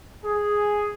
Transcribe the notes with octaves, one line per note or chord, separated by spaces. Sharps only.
G#4